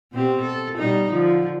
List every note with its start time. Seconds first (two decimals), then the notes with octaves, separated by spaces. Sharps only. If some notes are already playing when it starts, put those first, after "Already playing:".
0.13 B2 C4 G4
0.42 A4
0.78 B2 G3 D#4
1.11 D3 F3